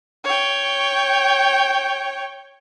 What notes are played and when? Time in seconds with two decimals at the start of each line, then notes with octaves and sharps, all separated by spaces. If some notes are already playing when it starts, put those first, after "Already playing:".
0.24 C#5 G5